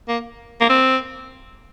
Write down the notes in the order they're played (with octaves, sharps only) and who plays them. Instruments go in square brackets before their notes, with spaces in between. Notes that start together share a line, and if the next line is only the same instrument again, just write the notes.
[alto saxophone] A#3
A#3
C4